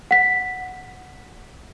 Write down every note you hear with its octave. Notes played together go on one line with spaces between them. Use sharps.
F#5 B6